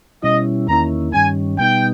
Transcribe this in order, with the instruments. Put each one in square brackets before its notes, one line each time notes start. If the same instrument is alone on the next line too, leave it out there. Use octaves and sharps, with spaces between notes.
[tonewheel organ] B2 G3 C#4 E4 [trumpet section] D#5
[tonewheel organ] E2 D#3 A#3 C#4 E4 [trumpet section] A#5
[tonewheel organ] G2 D#3 G3 C#4 [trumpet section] G#5
[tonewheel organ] B2 G3 B3 D#4 [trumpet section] G5